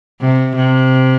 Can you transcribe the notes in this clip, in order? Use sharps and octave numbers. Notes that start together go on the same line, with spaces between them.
C3
C3